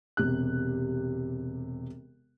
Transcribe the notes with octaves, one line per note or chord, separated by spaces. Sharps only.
E1 C3 G4 F#6